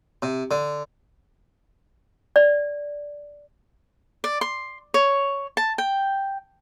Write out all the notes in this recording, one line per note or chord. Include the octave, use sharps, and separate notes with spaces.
C3
D3
D5
D5
C6
C#5
A5
G5